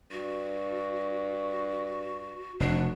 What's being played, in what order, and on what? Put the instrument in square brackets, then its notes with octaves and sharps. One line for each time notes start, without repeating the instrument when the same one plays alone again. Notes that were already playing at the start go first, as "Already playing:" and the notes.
[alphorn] G2 [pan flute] F#4
[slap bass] F1 [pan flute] D4 [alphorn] F#4